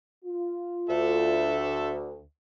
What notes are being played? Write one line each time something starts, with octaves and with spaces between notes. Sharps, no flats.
F4
D2 A4 E5